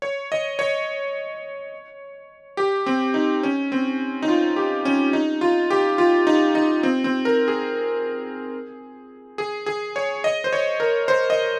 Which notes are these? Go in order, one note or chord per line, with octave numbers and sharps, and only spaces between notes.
C#5
D#5
C#5
G4
C4
D#4
C#4
C4
D#4
F4
G4
C#4
D#4
F4
G4
F4
D#4
D#4
C4
C4
A#4
G#4
G#4
G#4
C#5
D#5
C5
C#5
A#4
C5
D#5